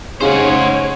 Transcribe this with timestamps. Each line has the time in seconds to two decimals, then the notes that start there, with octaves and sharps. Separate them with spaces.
0.21 C#3 D#4 G#4 C5 C#5 F#5